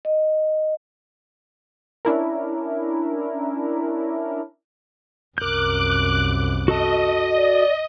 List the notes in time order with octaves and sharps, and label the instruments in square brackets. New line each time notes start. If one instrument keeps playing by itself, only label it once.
[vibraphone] D#5
[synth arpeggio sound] C#4 D4 E4 A#4
[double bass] C2 F#2 [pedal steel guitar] A#4 G6 [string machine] D6 F#6
[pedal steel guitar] F#4 A4 A5 [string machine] D#5
[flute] D5